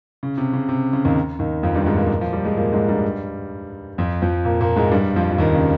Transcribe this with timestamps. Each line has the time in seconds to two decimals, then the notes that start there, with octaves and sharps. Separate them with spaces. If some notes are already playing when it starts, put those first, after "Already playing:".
0.23 C#3
0.38 C3
0.53 C#3
0.69 C3
0.93 C#3
1.05 D#2 D#3
1.39 D#2 D#3
1.63 F2 F3
1.75 G2 G3
1.86 G#2 G#3
1.98 A#2 A#3
2.21 F3
2.33 G3
2.45 G#3
2.57 A#2 A#3
2.72 G#2 G#3
2.89 G2 G3
3.98 F2 F3
4.22 F2 F3
4.45 A#2 A#3
4.61 A#2 A#3
4.76 G#2 G#3
4.91 G2 G3
5.16 F2 F3
5.32 F3
5.38 D#2 D#3
5.54 C#3